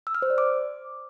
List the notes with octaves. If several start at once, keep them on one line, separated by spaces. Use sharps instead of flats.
E6
F6
C5
D5
D6